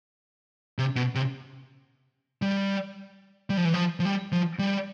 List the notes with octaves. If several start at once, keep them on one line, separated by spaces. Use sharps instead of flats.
C3
B2
C3
G3
G3
F3
E3
F3
F3
G3
F3
G3